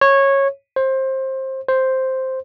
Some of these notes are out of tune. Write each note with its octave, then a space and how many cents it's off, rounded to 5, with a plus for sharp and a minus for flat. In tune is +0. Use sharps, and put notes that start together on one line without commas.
C#5 -15
C5 +20
C5 +0